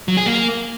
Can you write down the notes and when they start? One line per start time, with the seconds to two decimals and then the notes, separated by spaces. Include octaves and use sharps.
0.08 F#3
0.17 G#4
0.26 A#3